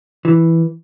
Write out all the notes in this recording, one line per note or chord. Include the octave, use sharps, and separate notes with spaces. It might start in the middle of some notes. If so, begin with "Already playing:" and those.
E3